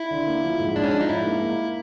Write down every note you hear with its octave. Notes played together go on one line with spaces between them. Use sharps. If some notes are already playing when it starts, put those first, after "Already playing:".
Already playing: E4
D3
A#3
F3
G#2
G#2 D4
C#4
F3 D4
D#4
G#2 E4
A#3
A#3